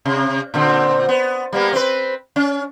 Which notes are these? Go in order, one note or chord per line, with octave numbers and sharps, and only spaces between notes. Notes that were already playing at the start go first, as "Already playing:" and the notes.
C3
A#2 D3 C4
B3
G3 A#3 B3
C4 B4
C#4